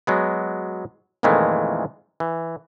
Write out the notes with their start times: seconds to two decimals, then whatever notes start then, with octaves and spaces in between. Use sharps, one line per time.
0.07 F#3 G#3 B3
1.23 F2 A#2 D#3 E3 G#3 A3
2.20 E3